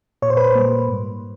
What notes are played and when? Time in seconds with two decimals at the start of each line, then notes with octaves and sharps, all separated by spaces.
0.22 A#2 C#5
0.30 C5
0.37 B4
0.44 C5
0.55 G3 A#3
0.89 G#2